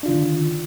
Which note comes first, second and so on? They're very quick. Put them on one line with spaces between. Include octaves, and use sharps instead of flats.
D4 F4 D#3 D3